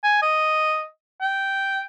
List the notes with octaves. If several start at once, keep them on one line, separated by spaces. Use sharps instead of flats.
G#5
D#5
G5